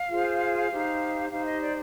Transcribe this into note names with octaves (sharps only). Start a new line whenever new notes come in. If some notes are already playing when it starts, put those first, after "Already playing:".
Already playing: F5
F4 G#4 C5
D#4 G4 C5
D#4 G4 C5 F5
D#5
D5